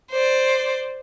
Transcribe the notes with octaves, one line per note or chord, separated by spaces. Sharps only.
C5 D5